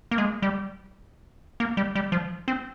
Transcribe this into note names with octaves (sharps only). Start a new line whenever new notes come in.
A#3
G#3
G3
A#3
G3
G3
F3
C4